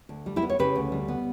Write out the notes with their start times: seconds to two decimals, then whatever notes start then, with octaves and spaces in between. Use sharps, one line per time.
0.09 D2
0.26 G3
0.36 E4 G4
0.42 B3
0.49 C#5
0.59 C#3 G4 B4
0.75 D2
0.92 G3
1.08 B3